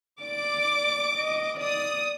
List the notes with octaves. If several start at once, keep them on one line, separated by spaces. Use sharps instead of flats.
D5 D6
D#5
D5 D#6